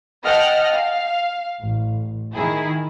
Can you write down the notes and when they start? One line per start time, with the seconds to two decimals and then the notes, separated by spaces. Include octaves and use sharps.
0.23 D#5 F#5 G5 A5 F6
0.72 F5
1.59 A1
2.33 D#3 E4 G#4